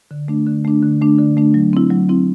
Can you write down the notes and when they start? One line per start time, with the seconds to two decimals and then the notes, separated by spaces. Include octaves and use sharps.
0.11 D3
0.28 A3 D4
0.47 D3
0.65 A3 D4
0.83 D3
1.01 A3 D4
1.18 D3
1.37 A3 D4
1.54 F#3
1.73 C4 E4
1.90 F#3
2.09 C4 E4